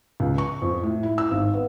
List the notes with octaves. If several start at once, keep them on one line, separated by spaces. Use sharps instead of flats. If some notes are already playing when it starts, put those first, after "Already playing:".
C#2
C#6
F2
A2
E4
E6
G#1
B3